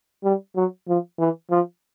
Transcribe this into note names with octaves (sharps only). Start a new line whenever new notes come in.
G3
F#3
F3
E3
F3